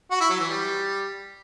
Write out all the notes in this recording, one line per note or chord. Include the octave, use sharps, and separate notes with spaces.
F#4
E4
F#3
E3
G3